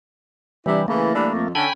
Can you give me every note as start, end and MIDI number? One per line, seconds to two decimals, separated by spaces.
0.66 0.81 48
0.66 0.86 52
0.66 0.86 55
0.66 0.81 62
0.66 0.81 64
0.88 1.12 49
0.88 1.12 52
0.88 1.48 57
0.88 1.48 58
1.13 1.29 52
1.13 1.29 55
1.13 1.29 62
1.33 1.50 41
1.55 1.67 50
1.55 1.67 61
1.55 1.67 69
1.55 1.73 79
1.55 1.73 80
1.55 1.73 83